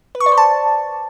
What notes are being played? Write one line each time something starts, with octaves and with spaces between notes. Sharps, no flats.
B4
C#6
D5
C5
A5